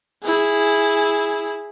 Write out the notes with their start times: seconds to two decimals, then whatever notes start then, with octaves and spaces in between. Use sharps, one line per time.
0.24 E4 G#4